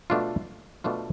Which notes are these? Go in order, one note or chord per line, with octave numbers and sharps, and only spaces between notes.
B2 A3 D4 F4
B2 A3 D4 F4